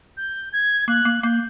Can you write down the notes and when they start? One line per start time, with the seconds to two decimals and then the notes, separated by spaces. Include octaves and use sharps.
0.17 G6
0.53 G#6
0.88 A#3 F#6
1.05 A#3
1.23 A#3 G6